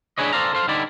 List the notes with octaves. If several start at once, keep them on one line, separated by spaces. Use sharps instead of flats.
D4 E4 G#4 B4 C#5 D#5
A4 A#4 C5 D5 F5 A#5
A4 C5 F5
D3 G3 D#4 E4 D5